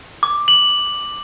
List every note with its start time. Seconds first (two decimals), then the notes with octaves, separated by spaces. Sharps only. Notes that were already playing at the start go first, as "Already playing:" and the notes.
0.23 D6
0.48 F#7